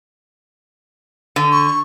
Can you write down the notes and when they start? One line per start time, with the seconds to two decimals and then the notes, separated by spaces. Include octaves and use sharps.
1.36 D3
1.52 C#6